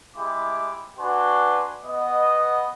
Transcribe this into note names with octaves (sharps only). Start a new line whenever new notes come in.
G#3 E4 G4 B5 D6
D4 F#4 B4 G#5 C6
B3 D#5